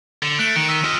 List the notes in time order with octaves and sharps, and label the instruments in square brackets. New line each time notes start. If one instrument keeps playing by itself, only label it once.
[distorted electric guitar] D3
[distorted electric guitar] A3 [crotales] F#6 D7
[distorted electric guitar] D#3 [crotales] C#7
[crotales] E6 B6 D#7
[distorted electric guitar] F3 D#5 [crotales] F6